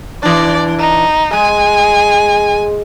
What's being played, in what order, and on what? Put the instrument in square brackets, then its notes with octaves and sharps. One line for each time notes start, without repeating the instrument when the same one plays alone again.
[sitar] E3 D4 [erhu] D5
[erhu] D#4
[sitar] G#3 [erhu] G#5